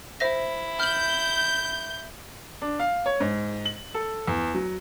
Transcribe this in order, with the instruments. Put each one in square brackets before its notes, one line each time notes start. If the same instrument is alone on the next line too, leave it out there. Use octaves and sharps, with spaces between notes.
[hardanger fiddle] E4 [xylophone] C5 E5 A#6
[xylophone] F6 F#7 [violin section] G6
[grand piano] D4
F5
C#5
G#2
F#7
A4
E2
F#3